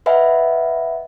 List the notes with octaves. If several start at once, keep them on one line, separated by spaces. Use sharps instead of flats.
B4 D#5 E5 F#5 G#5 B5